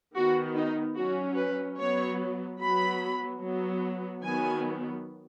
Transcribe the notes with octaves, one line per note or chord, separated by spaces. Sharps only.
D#3 B3 F#4
D#4
F#3 C#4 F#4
B4
F#3 B3 C#5
F#3 B3 B5
F#3 B3
D#3 F#3 B3 G#5